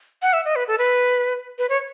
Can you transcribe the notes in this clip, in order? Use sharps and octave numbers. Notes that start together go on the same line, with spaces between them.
F#5
E5
D#5
B4
A4
B4
B4
C#5